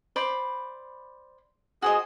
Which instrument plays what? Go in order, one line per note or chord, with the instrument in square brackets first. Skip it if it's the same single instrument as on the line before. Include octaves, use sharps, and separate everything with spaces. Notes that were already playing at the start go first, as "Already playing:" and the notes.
[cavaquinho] C5 D5 B5
[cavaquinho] F#4 C5 D#5 [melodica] G#4